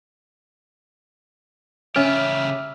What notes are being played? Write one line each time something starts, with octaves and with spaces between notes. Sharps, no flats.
C#3 C#4 G4 E5 F6